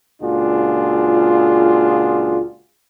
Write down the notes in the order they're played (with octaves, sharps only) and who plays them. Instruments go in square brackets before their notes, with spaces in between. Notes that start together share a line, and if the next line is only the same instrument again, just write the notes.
[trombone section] C#2 A#2 D4 F4 F#4 G#4